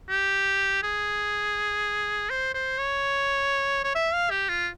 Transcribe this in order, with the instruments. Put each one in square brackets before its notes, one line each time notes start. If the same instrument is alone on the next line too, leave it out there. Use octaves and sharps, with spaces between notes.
[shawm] G4
G#4
C5
C5
C#5
C#5
E5
F5
G4
F4